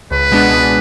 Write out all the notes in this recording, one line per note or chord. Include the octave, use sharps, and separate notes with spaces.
C#2 B4
B2 G#3 B3 D4
C#2